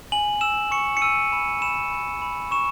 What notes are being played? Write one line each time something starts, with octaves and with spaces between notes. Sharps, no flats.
G#5 F#7
E6 E7
C#6 C#7
C#7
E6 D#7
B5 E7
B5 E7
B5
B5
C#6 E7